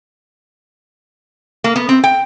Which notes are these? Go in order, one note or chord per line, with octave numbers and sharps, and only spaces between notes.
A#3
B3
C4
G5